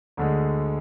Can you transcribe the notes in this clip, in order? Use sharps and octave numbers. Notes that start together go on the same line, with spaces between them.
D2 D3 G#3